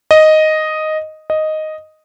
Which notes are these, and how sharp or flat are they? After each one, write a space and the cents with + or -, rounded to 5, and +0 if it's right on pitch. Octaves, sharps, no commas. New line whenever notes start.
D#5 +0
D#5 +0